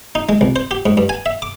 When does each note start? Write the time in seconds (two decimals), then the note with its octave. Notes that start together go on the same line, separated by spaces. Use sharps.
0.15 D#4
0.29 G#3
0.41 C2
0.56 C5
0.71 G4
0.86 G#2
0.97 G2
1.09 G#5
1.26 E5
1.42 D6